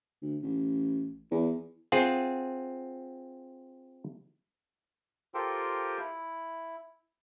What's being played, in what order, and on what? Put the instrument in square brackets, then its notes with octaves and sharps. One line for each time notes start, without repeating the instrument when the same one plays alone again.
[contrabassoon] D2
A1
E2
[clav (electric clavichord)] C4 F4 G#4 F#5
[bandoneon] F4 G4 A4 A#4 C5 G5
E4